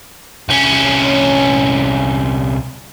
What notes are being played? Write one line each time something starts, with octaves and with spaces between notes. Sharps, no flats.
C2 C#4